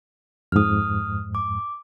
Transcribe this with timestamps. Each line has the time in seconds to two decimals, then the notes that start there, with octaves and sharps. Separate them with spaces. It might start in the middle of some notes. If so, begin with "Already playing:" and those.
0.52 F2 G#2 D#6 F6
1.35 D6